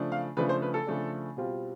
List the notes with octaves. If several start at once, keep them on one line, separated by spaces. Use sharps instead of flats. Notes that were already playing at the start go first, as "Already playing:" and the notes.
Already playing: C#3 F3 A3 D4
F5
C#3 F3 A3 D4 B4
C5
B4
A4
C#3 F3 A3 D4
B2 G3 C4 F4